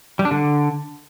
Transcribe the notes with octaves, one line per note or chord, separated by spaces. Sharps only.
G3
D4
D3